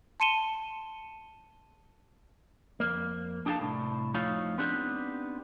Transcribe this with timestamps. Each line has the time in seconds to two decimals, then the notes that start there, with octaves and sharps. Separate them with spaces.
0.20 A5 C6 C#7 D#7 E7 G7
2.80 F2 A#3
3.46 D4 D#4 G4 A4 F5 A5
3.60 C2 A2
4.14 F2 A3 D#4 F4 C#5 F5
4.58 B3 C4 D4 D#4 G4